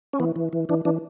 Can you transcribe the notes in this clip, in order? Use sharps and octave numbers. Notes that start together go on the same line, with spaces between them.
C#4
E3 B3
E3
E3
E3 D4
E3 D4